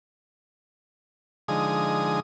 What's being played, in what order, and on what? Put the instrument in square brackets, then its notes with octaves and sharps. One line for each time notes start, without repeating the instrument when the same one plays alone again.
[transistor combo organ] D3 F3 G#3 D#4 G#4 D#6